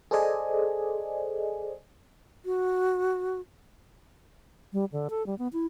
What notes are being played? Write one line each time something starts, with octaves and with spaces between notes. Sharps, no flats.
G#4 A4 C5 D5 D#5 G#5
F#4
G3
D3
A4
G3
B3
E4